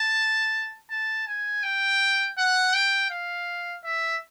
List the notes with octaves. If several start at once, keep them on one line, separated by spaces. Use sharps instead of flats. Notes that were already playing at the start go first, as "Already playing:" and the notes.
Already playing: A5
A5
G#5
G5
F#5
G5
F5
E5